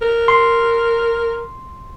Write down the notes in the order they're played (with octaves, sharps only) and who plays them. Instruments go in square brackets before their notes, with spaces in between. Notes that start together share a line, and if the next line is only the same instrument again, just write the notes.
[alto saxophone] A#4
[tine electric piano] C6